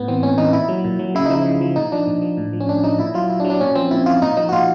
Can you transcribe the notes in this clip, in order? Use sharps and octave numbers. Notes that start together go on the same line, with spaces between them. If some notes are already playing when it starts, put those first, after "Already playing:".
Already playing: A2 B3
E3 C4
A2 C#4
E3 D#4
A#2 E4
F#3
A#2
F#3
C#3 E4
F3 D#4
E4
C#3
F3
A#2 D#4
F3 D4
A#2
F3
A2
F3
C#4
A2 D4
F3 D#4
A#2 E4
F#3 F4
A#2 E4
D4
F#3
D4
A#2 C#4
F3 C4
A#2 E4
F3 F4
A#2 D#4
F3 D#4
F#4
A#2 F4